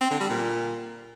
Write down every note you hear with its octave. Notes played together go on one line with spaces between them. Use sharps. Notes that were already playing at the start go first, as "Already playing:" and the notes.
C4
D3
G3
A#2